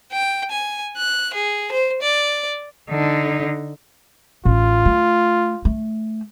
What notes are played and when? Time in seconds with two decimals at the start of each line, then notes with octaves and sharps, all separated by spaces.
0.12 G5
0.51 G#5
0.97 F#6
1.34 G#4
1.72 C5
2.02 D5
2.90 D3 D#4
4.45 A1 F4
4.85 A3
5.65 A3